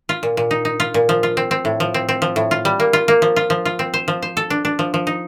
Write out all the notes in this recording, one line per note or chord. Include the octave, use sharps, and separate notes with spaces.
F4
A#2
A#2
D#4
D#4
F4
A#2
F3
F4
C4
C4
A2
F3
C4
C4
F3
A2
F4
G3
A#3
F4
A#3
F3
F4
F3
F4
C4
C5
F3
C5
A4
D4
D4
F3
F3
D#4